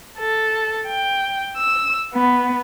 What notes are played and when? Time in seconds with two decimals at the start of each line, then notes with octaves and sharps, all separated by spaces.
0.18 A4
0.88 G5
1.57 E6
2.14 B3